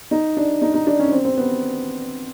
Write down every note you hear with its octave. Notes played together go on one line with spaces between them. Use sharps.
D#4
D4
D#4
D#4
D4
C#4
C4
C4
B3